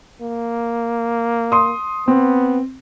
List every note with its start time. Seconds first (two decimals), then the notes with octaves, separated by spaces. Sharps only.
0.21 A#3
1.52 C6 D#6
2.08 B3 C4